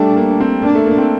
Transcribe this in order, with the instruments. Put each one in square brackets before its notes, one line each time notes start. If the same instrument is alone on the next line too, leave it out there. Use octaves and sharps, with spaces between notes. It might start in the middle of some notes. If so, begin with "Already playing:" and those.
Already playing: [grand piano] G3 A3 [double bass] D4
[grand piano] A#3
C4
[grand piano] A#3 [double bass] D4
[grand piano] A3
A#3
C4